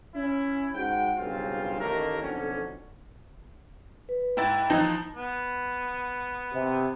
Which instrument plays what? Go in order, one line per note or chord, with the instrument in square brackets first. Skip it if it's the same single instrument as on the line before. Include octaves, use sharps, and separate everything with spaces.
[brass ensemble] C#4 E4
G#2 F#4 F#5 G5
B1 G2 C#3 C4 F4
A1 D#2 D#3 A3 A#3 A#4
B1 F2 D3 C#4
[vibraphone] B4
[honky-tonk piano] G#2 E4 A6 [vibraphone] G5
[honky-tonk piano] E3 F3 [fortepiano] D#4
[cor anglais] B3
[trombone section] C3